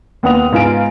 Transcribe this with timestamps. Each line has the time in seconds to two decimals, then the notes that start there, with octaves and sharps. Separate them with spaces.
0.23 D#2 B3 F#5 D#6 F7
0.52 G#2 B3 F4 G#5 D7